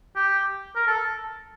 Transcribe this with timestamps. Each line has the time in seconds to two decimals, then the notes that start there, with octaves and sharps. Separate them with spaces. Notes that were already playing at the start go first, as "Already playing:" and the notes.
0.16 G4
0.76 A#4
0.87 A4